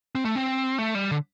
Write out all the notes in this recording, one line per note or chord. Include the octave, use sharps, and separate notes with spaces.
C4
A3
C4
A3
G3
D3